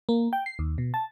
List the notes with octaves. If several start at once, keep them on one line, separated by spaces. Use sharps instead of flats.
A#3
G5
C7
D#2
B2
A5